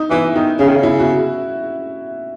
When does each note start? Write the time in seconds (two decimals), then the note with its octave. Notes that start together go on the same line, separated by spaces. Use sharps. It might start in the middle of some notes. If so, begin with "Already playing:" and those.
Already playing: D#4
0.10 E3 E4
0.35 D#3 D#4
0.59 C#3 C#4
0.68 D#3
0.75 C#3
0.83 E4
0.99 F#4